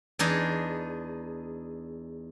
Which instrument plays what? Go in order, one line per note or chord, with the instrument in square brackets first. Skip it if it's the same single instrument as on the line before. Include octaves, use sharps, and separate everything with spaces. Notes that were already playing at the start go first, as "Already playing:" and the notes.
[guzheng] E2 D4 D#4 G#4